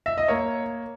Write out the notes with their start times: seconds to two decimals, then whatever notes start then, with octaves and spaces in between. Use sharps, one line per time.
0.06 E5
0.18 D#5
0.28 A#3 C#5